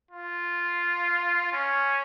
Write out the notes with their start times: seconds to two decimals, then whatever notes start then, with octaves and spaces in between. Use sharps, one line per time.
0.11 F4
1.52 C#4